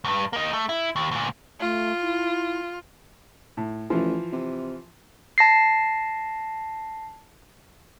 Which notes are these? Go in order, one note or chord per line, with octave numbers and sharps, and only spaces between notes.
D2 G2
A#3 D#4
A3
E4
D#2
D2 A#2
A3 F4
E4
A2
A1 E3 F3
C3
A5 A#6 C7